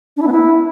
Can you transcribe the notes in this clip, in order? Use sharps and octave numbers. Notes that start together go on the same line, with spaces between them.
D4
E4
B3
E4